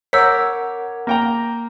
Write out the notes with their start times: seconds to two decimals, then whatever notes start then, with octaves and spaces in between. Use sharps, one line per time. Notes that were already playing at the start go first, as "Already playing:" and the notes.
0.13 A#4 C#5 F#5 D6 E6 G6 B6
1.07 A#3 G5 A#5